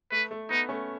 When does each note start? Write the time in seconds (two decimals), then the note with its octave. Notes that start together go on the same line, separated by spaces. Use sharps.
0.11 A3 B4
0.31 A3
0.50 B3 D#4
0.69 A3 C#4